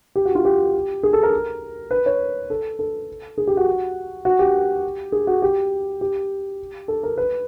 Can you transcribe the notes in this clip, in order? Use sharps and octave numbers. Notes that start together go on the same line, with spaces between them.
G4
F#4
F4
G4
G#4
A4
A#4
B4
C#5
A4
A4
G#4
G4
F#4
F#4
G4
G#4
F#4
G4
G4
A4
A#4
B4